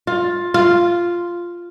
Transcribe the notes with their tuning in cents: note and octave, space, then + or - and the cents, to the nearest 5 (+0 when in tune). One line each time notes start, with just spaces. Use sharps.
F4 +15
F4 -5